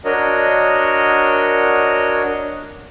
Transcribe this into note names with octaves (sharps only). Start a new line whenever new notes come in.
D4 F#4 A#4 C#5 D#5